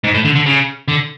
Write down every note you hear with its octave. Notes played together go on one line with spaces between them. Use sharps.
G#2
A2
D3
D3
C#3
D3